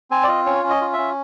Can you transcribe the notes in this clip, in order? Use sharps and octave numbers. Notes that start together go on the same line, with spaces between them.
C4 G#5
D5
F4 D#5
C#4 C#5
C#4
D#5
F4
C#4 E5